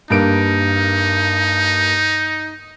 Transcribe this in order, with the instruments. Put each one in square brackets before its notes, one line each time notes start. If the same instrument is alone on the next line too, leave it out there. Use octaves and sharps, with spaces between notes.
[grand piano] G2 A#3 D7 [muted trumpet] D#4